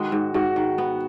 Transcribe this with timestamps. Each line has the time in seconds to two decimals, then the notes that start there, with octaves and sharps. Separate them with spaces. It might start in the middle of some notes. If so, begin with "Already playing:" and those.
Already playing: D#3 G#3 F#4
0.12 G#2
0.34 G#2 F#4
0.56 D#3
0.78 B3